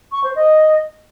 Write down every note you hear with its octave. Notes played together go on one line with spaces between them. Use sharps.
C#6
C5
D#5